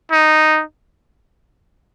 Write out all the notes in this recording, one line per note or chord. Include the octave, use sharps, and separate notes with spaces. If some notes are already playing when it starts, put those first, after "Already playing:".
D#4